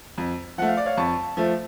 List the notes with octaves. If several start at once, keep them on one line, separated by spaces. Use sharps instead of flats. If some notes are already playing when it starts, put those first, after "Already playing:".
F2
F3 A3 F#5
F5
D5
C#5 F5
F2 A5 C#6
F3 A3